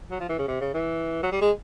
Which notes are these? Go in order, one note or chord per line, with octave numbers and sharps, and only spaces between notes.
F#3
F3
E3
C#3
C3
C#3
E3
F#3
G3
G#3